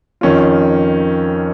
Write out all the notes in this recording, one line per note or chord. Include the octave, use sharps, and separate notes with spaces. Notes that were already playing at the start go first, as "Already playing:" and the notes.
F2 D#3 C#4 F4